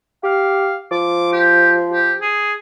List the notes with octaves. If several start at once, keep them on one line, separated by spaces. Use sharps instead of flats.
G4 F5
F3 D6
G4
G4
G#4